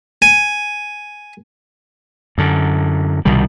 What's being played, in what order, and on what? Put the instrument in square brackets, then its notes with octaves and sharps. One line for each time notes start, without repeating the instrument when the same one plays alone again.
[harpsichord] G#5
[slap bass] F#2 D3
C2 B2 D#3 G3